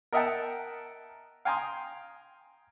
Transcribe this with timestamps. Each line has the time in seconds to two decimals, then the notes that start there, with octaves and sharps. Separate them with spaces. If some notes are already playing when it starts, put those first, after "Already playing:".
0.12 A#4 D#5 E5 F#5 G5 A5
1.45 F5 G5 G#5 A#5 C6 D#6